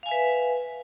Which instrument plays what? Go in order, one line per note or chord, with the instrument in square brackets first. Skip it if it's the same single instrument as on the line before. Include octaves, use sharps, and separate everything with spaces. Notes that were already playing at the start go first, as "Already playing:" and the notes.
[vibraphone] F5
G#5
E5
B4